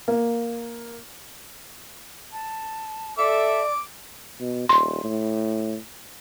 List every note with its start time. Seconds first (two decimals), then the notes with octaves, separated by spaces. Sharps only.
0.08 A#3
2.32 A5
3.18 A4 D5 E5 D6
4.40 B2
4.69 D#1 C6
5.04 A2